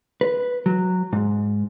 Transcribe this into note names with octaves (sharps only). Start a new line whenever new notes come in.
B4
F#3
G#2